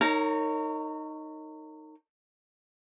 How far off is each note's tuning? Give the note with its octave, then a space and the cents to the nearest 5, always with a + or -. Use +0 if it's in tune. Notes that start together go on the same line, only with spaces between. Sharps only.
D#4 +0 A#4 -35 C#5 +0